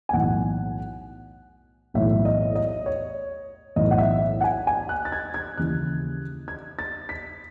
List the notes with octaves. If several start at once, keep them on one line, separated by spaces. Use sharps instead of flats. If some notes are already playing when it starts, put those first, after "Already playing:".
G#5
B1 A2 E3 F#5
B1 A2 E3 E5
D#5
D#5
C#5
B1 A2 E3 D#5
F#5
E5
F#5
G#5
G#5
F#6
A6
G#6
G#6
D#2 C#3 E3 F#6
G#6
A6
B6